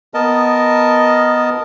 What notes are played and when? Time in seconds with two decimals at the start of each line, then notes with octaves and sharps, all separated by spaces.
0.14 B3 A#4 D#5 A5